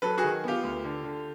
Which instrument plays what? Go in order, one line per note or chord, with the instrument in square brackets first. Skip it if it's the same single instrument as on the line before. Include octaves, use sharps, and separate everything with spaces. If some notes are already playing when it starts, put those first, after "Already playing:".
[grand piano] F#3 A4 B4
F#4 G#4
D#3
B3 F4 G4
D2
D3
D3